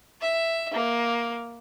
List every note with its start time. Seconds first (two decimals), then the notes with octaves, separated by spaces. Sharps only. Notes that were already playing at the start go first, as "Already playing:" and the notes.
0.21 E5
0.73 A#3